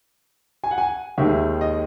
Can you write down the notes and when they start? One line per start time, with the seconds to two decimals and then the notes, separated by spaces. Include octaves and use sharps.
0.64 G#5
0.71 F#5
0.78 G#5
1.17 D#2 D#3 G#3 E5
1.61 D#5